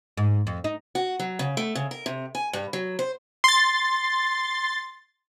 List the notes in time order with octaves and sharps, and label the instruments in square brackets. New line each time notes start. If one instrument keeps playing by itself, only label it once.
[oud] G#2
F2
D#4
[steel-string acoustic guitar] F#4
F#3
C#3
A3
C#3
A#4
C3
G#5
G2
F#3
C5
[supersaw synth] C6 A6